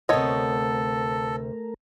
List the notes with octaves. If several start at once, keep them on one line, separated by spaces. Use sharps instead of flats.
D2 C3 A3 B3 A4 A#4 C#5 D#5